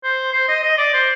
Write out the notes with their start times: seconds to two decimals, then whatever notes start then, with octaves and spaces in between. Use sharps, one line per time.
0.04 C5
0.33 C5
0.48 D#5
0.63 D#5
0.78 D5
0.94 C5